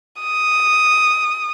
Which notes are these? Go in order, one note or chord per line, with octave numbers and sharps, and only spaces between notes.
D#6